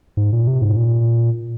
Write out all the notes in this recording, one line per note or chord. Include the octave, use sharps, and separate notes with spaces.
G#2
A#2
C3
G#2
A#2